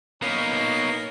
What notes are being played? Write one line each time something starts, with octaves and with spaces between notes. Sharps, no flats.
A#3 B3 C#4 D#4